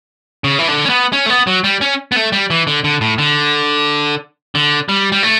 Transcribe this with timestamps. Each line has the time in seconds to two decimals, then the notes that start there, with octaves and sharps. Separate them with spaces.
0.44 C#3
0.59 E3
0.68 D3
0.85 C#4
0.90 B3
1.13 C#4
1.26 A3
1.30 B3
1.47 F#3
1.64 G3
1.81 C#4
2.12 B3
2.16 A3
2.32 G3
2.50 E3
2.67 D3
2.84 D3
3.01 A2
3.18 D3
4.55 D3
4.89 G3
5.12 G3
5.23 A3